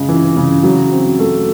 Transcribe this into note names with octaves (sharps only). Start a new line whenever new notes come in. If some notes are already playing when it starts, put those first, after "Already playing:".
Already playing: C#3 G#3
E3
C#3
F#3
C4
A3